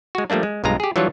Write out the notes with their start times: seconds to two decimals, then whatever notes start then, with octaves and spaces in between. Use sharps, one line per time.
0.15 G#3 F#4
0.30 F3 G3 A3 A#3 D4
0.43 G#3
0.64 B1 G2 G#3 F4 A#5
0.80 G4 G#4
0.96 E3 F#3 G3 D4 F4 C#5